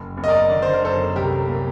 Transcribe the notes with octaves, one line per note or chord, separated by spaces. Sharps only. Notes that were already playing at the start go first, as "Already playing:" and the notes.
Already playing: F#1
F#1
D#5
A#4 D5
D3 D5
C5
A#4
F#2 A4 C5
C2 G4 A#4
A#2